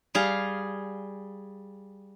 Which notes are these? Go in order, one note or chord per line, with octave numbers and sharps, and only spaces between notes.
G3 G#4 F5